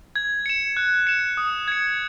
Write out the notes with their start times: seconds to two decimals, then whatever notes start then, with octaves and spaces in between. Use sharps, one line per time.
0.16 G#6
0.46 C#7 E7
0.77 F#6
1.07 C#7 E7
1.37 D#6
1.68 G#6 C#7